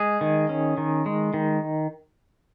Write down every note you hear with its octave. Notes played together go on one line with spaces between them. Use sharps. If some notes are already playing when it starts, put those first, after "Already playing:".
Already playing: G#3 G#4
D#3
C#4
D#3
G#3
D#3